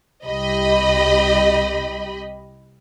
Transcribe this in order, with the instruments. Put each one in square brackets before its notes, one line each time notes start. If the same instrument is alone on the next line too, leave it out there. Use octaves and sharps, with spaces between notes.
[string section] C2 G4 D#5 B5